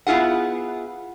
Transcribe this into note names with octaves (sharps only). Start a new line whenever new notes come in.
B3 E4 F4 G#4 F#5